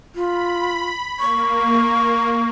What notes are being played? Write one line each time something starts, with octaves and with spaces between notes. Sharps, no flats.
F4 B5
A#3 C#6